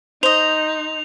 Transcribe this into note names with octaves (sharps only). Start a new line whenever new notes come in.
D#4 C5 D#5 F7